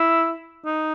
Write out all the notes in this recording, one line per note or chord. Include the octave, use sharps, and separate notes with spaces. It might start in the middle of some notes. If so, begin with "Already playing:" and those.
Already playing: E4
D#4